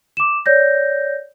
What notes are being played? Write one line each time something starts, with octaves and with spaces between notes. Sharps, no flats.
D6 E7
C#5 D5 G6 A#6